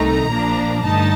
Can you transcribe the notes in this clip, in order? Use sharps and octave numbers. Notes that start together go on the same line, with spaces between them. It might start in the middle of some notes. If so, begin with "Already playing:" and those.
Already playing: C2 C3 D#3 A3 D#4 A#5
A#1 A#2 F3 A#3 D4
G2 D3 A3 D#4 A5